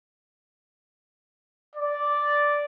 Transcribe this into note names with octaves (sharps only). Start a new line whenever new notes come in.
D5